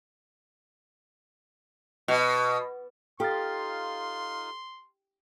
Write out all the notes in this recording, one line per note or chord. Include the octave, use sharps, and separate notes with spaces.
B2
D#4 F4 G4 A4 F5 C6 F6 A6